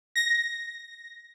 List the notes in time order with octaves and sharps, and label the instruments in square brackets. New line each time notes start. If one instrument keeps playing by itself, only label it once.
[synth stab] A#6